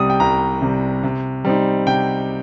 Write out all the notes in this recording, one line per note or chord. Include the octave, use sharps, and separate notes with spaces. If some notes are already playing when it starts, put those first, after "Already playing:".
Already playing: C2 C3 G3 D#6
G5
C2 A#5
C3 G3
C3
G3 C4 D#4
C3 G5